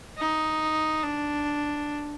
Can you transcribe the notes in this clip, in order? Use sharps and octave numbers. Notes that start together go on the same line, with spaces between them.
D#4
D4